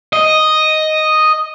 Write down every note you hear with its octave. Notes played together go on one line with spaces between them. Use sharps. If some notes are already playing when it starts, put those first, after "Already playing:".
D#5